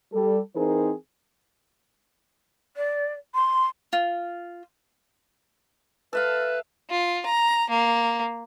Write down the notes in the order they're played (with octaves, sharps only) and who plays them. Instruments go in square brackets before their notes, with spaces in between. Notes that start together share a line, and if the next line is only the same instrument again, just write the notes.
[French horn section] G3 A4
E3 C4 D#4 G#4 A#4 C5
[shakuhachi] D5
C6
[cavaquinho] F4
[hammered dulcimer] A4 E5 F5 [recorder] B4
[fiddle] F4
A#5
A#3